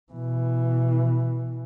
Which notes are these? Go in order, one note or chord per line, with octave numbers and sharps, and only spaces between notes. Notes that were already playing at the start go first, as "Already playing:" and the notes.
B2 E3